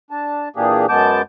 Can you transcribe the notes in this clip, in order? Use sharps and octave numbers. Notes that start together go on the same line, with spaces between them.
D4 A5
A#2 E3 A#3 D4 G4 G#4
F#2 G#3 B3 A5 D6 G6